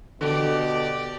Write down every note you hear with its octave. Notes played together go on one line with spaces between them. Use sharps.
B2 D3 G4 D5